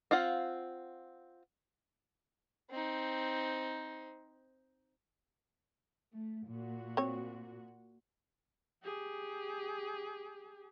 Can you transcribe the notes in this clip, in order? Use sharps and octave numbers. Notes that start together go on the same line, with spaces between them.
C4 F4 F5 F#5
C4 D#4
A3
A#2 F#4
C4 C#5
G4 G#4